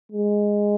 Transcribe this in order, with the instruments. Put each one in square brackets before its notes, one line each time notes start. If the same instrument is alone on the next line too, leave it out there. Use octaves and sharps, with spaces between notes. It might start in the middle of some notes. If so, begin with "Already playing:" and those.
[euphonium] G#3